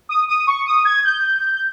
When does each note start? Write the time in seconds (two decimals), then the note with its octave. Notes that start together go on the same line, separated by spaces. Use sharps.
0.09 D#6
0.28 D#6
0.47 C#6
0.66 D#6
0.85 G#6
1.04 G6